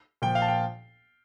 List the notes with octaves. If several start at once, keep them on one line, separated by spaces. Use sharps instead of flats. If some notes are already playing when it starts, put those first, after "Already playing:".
A#2 F3 G5
F5
A5
G5